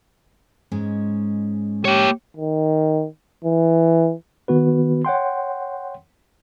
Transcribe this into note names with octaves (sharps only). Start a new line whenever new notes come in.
G#2 G#3 C#4
A#3 G4 C#5
D#3
E3
D#3 B3 F#4 B4
C#5 F#5 G5 C6